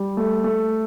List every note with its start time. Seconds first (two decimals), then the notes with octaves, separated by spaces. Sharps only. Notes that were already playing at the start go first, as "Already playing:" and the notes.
Already playing: G3
0.17 A3
0.44 A3